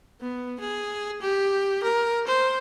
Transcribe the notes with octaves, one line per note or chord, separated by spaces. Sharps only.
B3
G#4
G4
A#4
C5